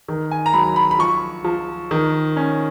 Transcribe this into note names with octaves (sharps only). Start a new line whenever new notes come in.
D#3
G#5
A#5
F#3 B5
B5
B5
F3 C#6
F3
D#3
C#4